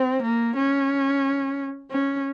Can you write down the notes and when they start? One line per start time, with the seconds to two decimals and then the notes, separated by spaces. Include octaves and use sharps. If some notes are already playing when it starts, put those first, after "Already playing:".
Already playing: C4
0.22 A#3
0.56 C#4
1.91 C#4